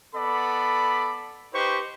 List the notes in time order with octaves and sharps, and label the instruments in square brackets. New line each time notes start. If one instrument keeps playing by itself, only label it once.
[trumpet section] B3 A4 D5 B5
D#4 G4 B4 C5 C#6